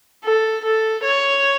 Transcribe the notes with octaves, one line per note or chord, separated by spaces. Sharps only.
A4
A4
C#5